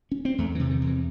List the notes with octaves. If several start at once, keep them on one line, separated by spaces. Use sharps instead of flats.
C#4
C4
E2 A3
E3
C3
D#3
E2 E3